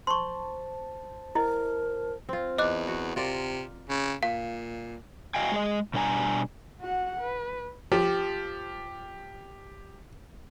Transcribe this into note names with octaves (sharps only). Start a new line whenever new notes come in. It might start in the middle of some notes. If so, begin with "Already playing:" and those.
C5 A5 C6 C#6
E4 A#4 D#5
C4 F4
E2 D#5 D6 F#6
F#4
C3 F4 A#4 D5
C#3
A#2 F5
F#4 D#5 F5 G5 G#5
G#3 G#4 D#5
B2 G3 D4 A#4 G#5 A#5
F#4 F#5
B4
F3 G4